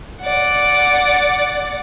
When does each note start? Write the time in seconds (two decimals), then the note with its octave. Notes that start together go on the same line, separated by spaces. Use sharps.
0.22 D5 F#5